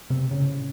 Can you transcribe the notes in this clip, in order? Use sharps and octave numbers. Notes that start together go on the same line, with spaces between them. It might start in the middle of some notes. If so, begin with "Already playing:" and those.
C3 C4
A2 C#3 C#4